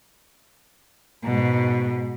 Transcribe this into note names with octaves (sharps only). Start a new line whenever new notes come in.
G#2 B2